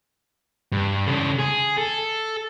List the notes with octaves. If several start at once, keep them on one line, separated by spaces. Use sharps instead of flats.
G2
C#3 A4
G#4
A4